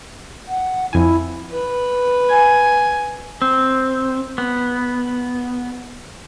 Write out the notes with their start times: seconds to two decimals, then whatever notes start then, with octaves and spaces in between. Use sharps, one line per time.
0.48 F#5
0.93 F2 E4 G#5
1.51 B4
2.29 G#5
3.42 C4
4.38 B3